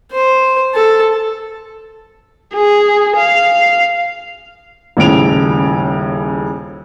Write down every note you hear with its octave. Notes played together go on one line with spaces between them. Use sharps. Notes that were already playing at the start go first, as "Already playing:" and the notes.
C5
A4
G#4
F5
D#1 A2 C#3 D7 F7